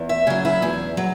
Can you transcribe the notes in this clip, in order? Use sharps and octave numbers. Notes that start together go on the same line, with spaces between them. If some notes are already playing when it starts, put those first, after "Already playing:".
Already playing: E2
E5
C#3 F#3 G#4
E4
E2 G#4
F#3